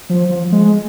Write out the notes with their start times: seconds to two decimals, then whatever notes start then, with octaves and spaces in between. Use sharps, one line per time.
0.09 F3
0.31 F3
0.52 G#3